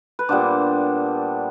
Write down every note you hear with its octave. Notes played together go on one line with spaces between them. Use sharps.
B4
A#2 G3 B3 D4 C5